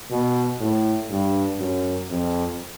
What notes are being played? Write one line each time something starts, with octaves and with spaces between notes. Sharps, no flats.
B2
A2
G2
F#2
F2